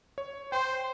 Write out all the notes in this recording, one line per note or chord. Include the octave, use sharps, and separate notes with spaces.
C#5
C5 G5 C6